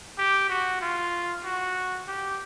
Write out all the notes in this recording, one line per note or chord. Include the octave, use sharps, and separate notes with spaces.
G4
F#4
F4
F#4
G4